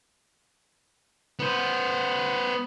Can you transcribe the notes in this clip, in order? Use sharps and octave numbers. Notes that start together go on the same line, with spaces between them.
B3 C5